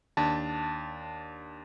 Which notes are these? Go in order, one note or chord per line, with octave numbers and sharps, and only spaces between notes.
D#2 D4 A5